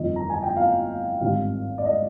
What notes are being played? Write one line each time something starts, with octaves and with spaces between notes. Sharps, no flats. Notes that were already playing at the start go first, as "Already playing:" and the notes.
Already playing: G1 F2 D#3 D#5
A#5
G#5
G5
F5
G#1 G2 D#3 G3 C4 F5
D5
D#5